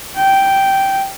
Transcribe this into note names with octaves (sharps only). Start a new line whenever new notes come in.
G5